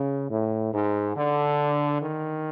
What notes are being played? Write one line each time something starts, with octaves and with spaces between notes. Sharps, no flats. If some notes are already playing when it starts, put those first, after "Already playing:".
Already playing: C#3
A2
G#2
D3
D#3